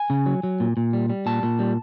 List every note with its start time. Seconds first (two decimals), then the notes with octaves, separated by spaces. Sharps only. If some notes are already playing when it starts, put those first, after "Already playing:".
Already playing: G#5
0.10 C#3
0.26 F#3
0.43 F#3
0.60 A#2
0.77 A#2
0.93 G3
1.10 G3
1.26 A#2 A5
1.43 A#2
1.60 G3